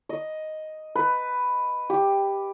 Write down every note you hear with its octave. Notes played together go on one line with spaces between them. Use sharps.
D#5
B4
G4